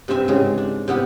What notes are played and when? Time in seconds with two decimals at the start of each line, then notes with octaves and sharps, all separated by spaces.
0.08 G2 C3 C4 E5 G#5
0.28 G#2 C#3 E3 G#3 C4
0.58 D4
0.88 C3 B3 E4 G4